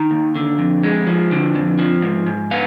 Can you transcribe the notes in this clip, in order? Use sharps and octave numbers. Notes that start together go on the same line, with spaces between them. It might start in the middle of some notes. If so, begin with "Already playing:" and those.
Already playing: D#3 A#5
D#2
D3
F2
G#3
F3
D3
F2
F3
G#2
G#2
B3 F5